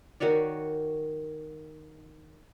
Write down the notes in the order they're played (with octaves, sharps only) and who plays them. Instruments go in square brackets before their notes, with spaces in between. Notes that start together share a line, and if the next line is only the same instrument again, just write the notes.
[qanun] D#3 F#4 C#5 D5